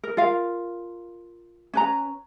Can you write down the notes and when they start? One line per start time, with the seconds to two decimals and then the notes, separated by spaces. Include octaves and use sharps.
0.04 A#4
0.17 F4 A#4 F5
1.74 C#4 B4 A#5